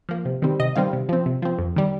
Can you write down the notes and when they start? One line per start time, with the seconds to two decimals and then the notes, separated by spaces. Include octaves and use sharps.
0.09 F3 A#3
0.25 C3
0.42 D#3 G3 C4
0.60 C3 D#5
0.76 D#3 G3 C4 F5
0.93 C3
1.09 F3 C4
1.26 C3
1.42 F3 C4
1.59 F2
1.76 D#3 G3